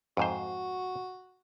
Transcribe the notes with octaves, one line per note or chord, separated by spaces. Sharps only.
F2 G#2 F#4 C5